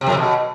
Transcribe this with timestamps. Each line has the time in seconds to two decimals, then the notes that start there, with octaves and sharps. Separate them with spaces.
0.01 C3
0.06 F2
0.12 C3
0.17 B2